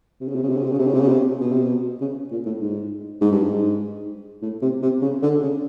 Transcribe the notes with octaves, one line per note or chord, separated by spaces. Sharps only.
C3
C#3
C3
C#3
C3
C#3
C3
C#3
C3
C#3
C3
C#3
C3
B2
C3
B2
C#3
A#2
A2
G#2
G#2
G2
G#2
A2
C3
C3
C#3
D3
C#3